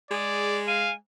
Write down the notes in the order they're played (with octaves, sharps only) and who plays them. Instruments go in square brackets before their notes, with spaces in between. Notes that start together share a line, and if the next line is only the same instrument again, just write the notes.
[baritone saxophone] G#3 [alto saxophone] G#4 [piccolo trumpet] D5
[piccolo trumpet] F5 [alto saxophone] G#5